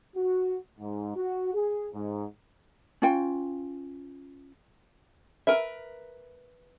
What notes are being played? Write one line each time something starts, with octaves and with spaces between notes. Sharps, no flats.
F#4
G#2
F#4
G#4
G#2
C#4 F4 G5
A#4 B4 E5